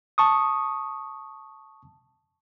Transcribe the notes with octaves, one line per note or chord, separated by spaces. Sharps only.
A5 C#6 D#6